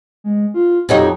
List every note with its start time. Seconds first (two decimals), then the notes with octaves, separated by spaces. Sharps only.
0.24 G#3
0.54 F4
0.89 F2 F#3 D#4 G4